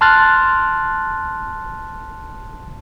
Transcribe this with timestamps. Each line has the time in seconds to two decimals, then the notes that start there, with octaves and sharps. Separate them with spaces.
0.01 A5 C6 F6 F#6 A6